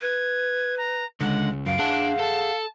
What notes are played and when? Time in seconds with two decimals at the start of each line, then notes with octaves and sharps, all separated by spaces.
0.02 B4 G#6
0.77 A#5
1.21 C#2 D3 G#3 F#5
1.66 F#2 F5 D7
1.79 D4 G#4 E5 F#5 A5
2.19 A4 A5